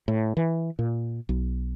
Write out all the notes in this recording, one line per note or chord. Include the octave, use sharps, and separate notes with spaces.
A2
E3
A#2
B1